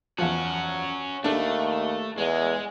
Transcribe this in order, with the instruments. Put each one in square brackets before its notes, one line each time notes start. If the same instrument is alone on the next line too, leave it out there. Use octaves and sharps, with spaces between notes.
[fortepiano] E2 F3 [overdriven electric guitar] C#4 F#4
[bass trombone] D#2 [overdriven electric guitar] A3 [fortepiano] D4 A4
[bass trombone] E2 [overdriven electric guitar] G#3